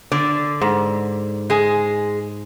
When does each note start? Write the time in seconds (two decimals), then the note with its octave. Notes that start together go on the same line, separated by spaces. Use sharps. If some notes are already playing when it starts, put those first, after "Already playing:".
0.12 D3 D5
0.61 G#2
1.50 G#3 G#4